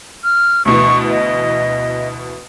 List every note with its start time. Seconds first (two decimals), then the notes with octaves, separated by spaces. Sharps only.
0.24 F6
0.65 D2 B2 E3 C#6
1.09 D#5